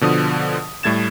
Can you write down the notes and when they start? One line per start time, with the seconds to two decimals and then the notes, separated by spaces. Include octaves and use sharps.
0.01 B2 D3 F3 D#6
0.83 A2 G3 A3 G#6 A6 E7